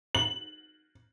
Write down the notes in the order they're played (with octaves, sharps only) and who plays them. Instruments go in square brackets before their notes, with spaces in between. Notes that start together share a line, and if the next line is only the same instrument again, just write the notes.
[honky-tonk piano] F#7